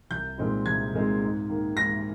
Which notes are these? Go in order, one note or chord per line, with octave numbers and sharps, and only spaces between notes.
C2 G6
A#2 G#3 C4 D#4
C2 G#6
A#2 G#3 C4 D#4
G#2
D#3 A#3
G#2 A#6